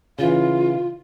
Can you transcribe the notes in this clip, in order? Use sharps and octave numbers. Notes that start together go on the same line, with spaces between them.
C#3 E3 F4 F5